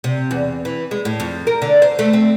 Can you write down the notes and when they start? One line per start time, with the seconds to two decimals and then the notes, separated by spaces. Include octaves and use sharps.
0.04 C3
0.31 E2
0.65 E3
0.91 G#3
1.05 A2
1.20 F2
1.47 A#4
1.62 D3
1.82 C5
1.99 A3
2.13 C4